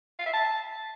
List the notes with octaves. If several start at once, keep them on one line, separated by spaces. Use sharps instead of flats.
F5
E5
A5